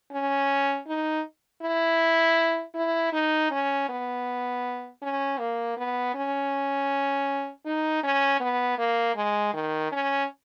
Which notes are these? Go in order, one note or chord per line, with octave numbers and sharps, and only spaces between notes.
C#4
D#4
E4
E4
D#4
C#4
B3
C#4
A#3
B3
C#4
D#4
C#4
B3
A#3
G#3
D#3
C#4